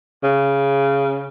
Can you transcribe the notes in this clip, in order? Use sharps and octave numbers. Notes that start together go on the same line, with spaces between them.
C#3